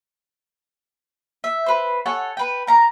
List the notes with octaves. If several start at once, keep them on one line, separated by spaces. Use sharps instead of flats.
E5
B4 C5
A4 C#5 F#5 G#5
B4 G5
A#4 A#5